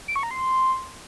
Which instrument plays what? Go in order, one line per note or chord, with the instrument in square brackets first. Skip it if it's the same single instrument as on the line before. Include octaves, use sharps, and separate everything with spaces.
[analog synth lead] D7
C#6
A#5
C6